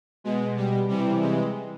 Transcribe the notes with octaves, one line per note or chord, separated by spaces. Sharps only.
B2 G#3
G3
C3 E3 G3
G#3